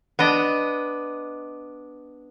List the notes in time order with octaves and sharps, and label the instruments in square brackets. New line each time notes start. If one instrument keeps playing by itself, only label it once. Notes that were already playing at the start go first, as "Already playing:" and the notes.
[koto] B3 D4 D#5